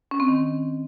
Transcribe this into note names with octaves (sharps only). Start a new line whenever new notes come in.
C#4
C4
D#3